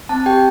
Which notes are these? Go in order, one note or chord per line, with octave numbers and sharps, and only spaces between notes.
C4 A5
G4 G5